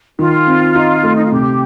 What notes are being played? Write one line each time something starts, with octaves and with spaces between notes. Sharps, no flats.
D#3 F4
C4
D#4
A3
D#4
F4
C3 G4